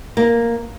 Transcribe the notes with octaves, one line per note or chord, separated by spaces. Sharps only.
A#3